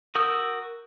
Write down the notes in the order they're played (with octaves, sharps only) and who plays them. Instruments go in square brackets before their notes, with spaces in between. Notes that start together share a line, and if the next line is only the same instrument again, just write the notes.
[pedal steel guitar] F#4 A#4 D#6 E6 G6